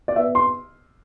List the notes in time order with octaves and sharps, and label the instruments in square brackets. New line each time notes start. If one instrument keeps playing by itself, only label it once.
[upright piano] D5
B3 E5
C6